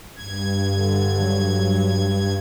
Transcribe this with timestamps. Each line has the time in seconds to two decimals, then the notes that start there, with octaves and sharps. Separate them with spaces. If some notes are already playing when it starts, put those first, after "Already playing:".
0.16 G2 G#6
0.71 D3
1.20 F#3